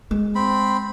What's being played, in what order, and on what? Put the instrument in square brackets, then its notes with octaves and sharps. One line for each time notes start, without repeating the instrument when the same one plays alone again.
[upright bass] G#3
[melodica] C4 B5